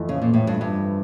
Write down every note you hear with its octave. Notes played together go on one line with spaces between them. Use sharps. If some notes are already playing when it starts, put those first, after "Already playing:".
Already playing: F2 E3 A3
C#3
A#2
A2
G2
G2